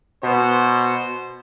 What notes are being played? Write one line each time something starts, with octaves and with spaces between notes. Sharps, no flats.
B2 B3 C5